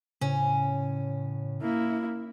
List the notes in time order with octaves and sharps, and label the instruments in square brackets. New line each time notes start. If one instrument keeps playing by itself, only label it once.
[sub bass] A2 [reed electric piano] C#3 [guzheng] C#4
[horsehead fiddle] A#3 E4